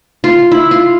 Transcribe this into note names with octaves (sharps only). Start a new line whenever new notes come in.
F4
E4
F4